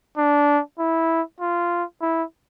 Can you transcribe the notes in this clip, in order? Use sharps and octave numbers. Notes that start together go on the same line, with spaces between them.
D4
E4
F4
E4